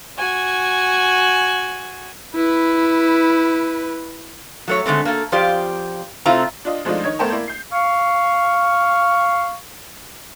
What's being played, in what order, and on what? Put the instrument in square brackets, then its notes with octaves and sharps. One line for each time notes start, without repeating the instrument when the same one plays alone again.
[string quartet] F#4 G#5
[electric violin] E4 B4
[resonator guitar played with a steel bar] F#3 A3 C#5
D3 G#3 A3 C4
A#3 A4
F2 F3 F4 G4 C5 D5
C3 A3 C4 E4 F4 A#5
[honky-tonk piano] D4 F4 D#5
F3 G#3 A3 D4 D#4 F4
D#3 C#5 D#5 G#6
A3 B3 A#4 C5 G5 A5
A#3 E4 D5
G6 C7
[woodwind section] F5 C#6